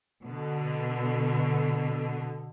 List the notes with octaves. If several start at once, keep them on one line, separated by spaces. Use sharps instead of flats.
B2 D3